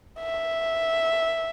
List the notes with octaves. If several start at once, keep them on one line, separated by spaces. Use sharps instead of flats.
E5